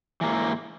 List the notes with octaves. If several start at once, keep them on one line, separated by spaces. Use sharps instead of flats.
G#2 E3 A#3